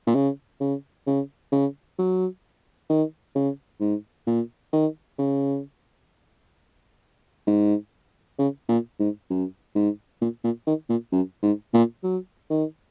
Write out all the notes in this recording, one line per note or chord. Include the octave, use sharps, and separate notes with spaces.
A#2
C#3
C#3
C#3
C#3
F#3
D#3
C#3
G#2
A#2
D#3
C#3
G#2
C#3
A#2
G#2
F#2
G#2
A#2
A#2
D#3
A#2
F#2
G#2
A#2
F#3
D#3